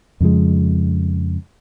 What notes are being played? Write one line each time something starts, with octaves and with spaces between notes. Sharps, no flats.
F2 C#3 F3 G#3